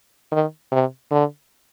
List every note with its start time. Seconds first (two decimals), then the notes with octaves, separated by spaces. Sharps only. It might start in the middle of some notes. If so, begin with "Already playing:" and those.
0.32 D#3
0.72 C3
1.11 D3